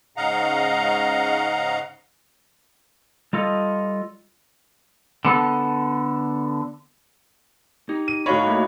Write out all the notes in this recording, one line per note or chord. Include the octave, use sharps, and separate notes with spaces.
G#2 C#3 D#5 F5 F#5 A#5
G3 F4 A4 D#5
D3 B3 A4
D#4 G4
D#7
A2 D#4 F#4 C#5 D#5 F5 B5
A3 A#3